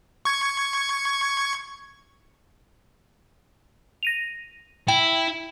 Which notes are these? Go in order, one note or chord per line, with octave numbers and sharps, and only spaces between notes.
C#6 G#6
A#6 D#7 F7
E4 G5